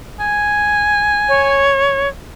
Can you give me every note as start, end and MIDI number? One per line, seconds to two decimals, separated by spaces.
0.20 1.69 80
1.29 2.08 73